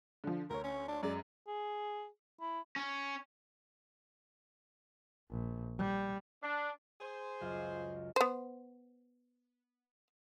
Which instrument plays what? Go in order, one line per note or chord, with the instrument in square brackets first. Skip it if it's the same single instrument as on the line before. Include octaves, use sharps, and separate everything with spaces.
[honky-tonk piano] D3 F3
[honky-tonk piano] D2 C#5 [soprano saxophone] A#4
[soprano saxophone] C#4
D4
[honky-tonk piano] F#2 G#3 [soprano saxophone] D5
[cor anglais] G#4
E4
[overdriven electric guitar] C#4
[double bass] A#1
G3
[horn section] D4
G#4 C5
[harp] C#2 F#2 F4
[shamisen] B3 C5